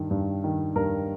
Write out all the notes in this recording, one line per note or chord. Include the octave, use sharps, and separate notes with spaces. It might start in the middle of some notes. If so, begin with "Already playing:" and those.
Already playing: G2 D#3
G2
D#3
G2 A#4